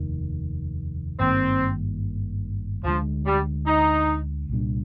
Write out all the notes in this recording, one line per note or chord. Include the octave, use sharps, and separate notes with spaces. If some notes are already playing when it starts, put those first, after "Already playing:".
Already playing: F1 D#2 D#3
G#1 G2 D#3 A#3 C4
D2 D3 F3 G#3
G3
D#4
C2 A#2 G3 D4